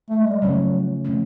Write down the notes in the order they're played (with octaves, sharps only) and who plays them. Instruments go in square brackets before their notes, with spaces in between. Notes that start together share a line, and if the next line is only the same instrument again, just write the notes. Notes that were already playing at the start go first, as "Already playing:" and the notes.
[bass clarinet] A3
G#3
G3
[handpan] C#3 F3 A3 C#4 [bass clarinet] F#3
[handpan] C#3 F3 A3 C#4